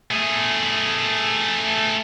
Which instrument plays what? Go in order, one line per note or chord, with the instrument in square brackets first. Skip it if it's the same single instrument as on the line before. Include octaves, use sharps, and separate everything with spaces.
[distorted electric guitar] A3 G#4